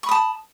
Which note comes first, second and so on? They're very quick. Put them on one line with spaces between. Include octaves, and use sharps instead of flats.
C#6 B5 D#6 A5